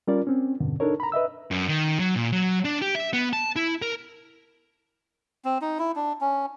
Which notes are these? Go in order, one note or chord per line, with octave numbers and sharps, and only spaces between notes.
G3 C#4 F4 A#4 D5
C4 C#4
E2 G2 B2 D3
D4 D#4 A4 A#4 C#5
A#5 B5
B4 D#5 E5 E6
F#2
D#3
F#3
A#2
F#3
D4
G4
E5
B3
A5
E4
A#4
C4
D#4
E4
D4
C#4